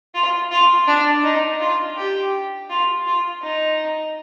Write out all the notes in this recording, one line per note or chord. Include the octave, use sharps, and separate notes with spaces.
F4
F4
D4
D#4
F4
G4
F4
F4
D#4